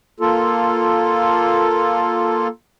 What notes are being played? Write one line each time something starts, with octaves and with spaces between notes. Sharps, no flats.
A#3 F4 A4